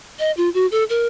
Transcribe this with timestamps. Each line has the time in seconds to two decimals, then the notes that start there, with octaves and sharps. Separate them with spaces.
0.19 D#5
0.37 F4
0.54 F#4
0.72 A4
0.90 A#4